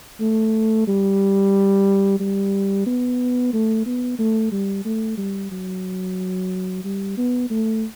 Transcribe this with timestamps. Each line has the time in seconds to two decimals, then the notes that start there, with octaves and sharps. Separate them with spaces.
0.20 A3
0.87 G3
2.20 G3
2.87 B3
3.53 A3
3.86 B3
4.19 A3
4.52 G3
4.85 A3
5.18 G3
5.52 F#3
6.84 G3
7.17 B3
7.50 A3